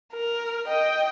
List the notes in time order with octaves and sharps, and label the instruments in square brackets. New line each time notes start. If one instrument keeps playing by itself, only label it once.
[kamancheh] A#4
D#5 G5